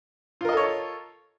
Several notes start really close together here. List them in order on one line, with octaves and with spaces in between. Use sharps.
F4 A#4 D#5 A4 C#5